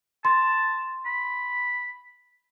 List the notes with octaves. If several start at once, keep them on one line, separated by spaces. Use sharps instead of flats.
A5 C6
B5